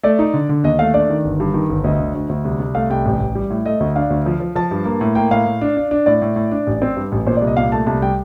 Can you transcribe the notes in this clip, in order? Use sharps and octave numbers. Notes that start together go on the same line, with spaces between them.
A3 D5
D#4
D3
D3
D#2 D#5
A3 F5
D4 D5
D#3
G1
G2
D#3
G1
D2 D#5
D3
D2
D2
C2
C2
A3 F5
C2 G5
A1
A1
G3
A2
A3 D#5
D2
D4 F5
D2
F3
F3
F3 A5
G2
A#3
A2
A#3 G5
A2 F5
A2
D4
D4
D4
A2 D5
A2
A2
D4
A1
C4
G2
A1
A#2 C5
D5
C2
D#5
A#2 F5
A3 A5
C2 A5
G3 G5